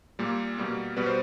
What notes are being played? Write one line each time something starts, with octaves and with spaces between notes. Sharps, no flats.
A#2 G3 A#3
B2 G3 A#3
B2 G3 B3 B4
C5